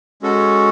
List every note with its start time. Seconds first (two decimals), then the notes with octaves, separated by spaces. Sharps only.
0.22 G#3 C#4 F#4 A4